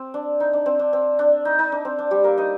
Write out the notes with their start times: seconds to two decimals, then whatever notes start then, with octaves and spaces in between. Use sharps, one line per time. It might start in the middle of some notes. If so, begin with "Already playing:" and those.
Already playing: C4
0.14 D4
0.40 D#4
0.53 D4
0.66 C4
0.79 D4
0.93 C4
1.19 D4
1.45 D#4
1.59 D#4
1.72 D4
1.85 C4
1.99 D4
2.11 G3 G4
2.24 A#3 A#4
2.38 D#4 D#5